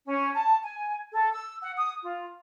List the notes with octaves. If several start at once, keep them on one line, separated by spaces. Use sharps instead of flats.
C#4
A5
G#5
A4
E6
F#5
D#6
F4